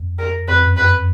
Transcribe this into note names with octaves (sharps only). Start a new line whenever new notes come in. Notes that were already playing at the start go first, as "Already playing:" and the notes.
Already playing: F2
A#4
F2 B4
F#2
B4